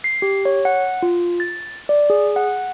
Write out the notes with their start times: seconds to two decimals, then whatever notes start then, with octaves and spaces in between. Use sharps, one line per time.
0.04 C7
0.22 G4
0.45 C#5
0.65 F#5
1.02 F4
1.40 A6
1.89 D5
2.10 G#4
2.36 F#5